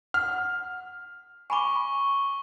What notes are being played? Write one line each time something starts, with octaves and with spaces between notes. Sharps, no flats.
F#5 F6
G#5 B5 C#6 D6 G7